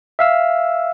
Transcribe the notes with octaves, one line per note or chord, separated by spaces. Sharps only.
E5 F5 E6